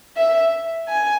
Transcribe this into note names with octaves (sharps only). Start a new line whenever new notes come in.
E5
G#5